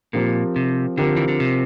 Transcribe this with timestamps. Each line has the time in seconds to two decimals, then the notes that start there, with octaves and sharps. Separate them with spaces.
0.13 A#2 F3 C4 G4 A#4
0.56 C3
0.97 D3 F3 C4 G4 A#4
1.16 E3
1.28 D3
1.40 C3